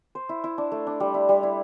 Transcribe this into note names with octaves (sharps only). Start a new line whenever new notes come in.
C5
E4
E4
D4
A3
D4
G3
E4
G3
E4